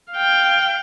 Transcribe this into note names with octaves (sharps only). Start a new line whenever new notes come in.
F5 G5